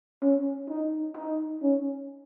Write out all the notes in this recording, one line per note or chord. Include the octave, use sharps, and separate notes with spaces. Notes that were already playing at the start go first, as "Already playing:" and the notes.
C#4
D#4
D#4
C#4